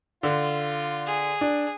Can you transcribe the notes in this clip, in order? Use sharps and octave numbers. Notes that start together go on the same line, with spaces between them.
D3 F4
G#4
D4